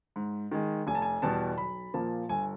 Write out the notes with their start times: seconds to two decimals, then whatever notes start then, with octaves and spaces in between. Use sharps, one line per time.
0.16 G#2
0.51 D#3 G#3
0.87 F1 G#5
0.95 A5
1.02 G#5
1.22 E2 B2 G3 B3 A5
1.58 B1 B5
1.94 A#2 F3 A#3 A5
2.29 G1 G#5